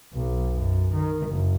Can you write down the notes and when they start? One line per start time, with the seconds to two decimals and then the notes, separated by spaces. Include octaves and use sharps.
0.13 B1
0.53 F#2
0.94 D#3
1.28 F#1